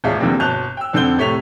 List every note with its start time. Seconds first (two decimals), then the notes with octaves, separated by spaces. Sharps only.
0.04 D#1 A1 G#3 D5 E5 F5
0.20 E2 D3 F3 G3 A#3 C4
0.40 G1 B2 A5 F#6 G6 F7
0.77 G5 E6
0.93 F2 D3 C4 F#5 G6 G7
1.17 A2 C3 A3 C#5 B6 F7